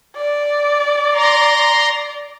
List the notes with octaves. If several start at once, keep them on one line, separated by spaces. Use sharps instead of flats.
D5
A#5 C6